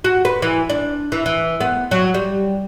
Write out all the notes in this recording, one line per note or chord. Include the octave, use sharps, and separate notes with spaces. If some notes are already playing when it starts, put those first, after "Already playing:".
F#4
B4
E3
D4
E3
E3
B3
F#3
G3